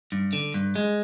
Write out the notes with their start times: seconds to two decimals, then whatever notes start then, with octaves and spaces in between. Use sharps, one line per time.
0.12 G2
0.33 D3
0.54 G2
0.76 G#3